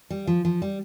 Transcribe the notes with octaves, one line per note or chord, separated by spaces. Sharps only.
G3
F3
F3
G3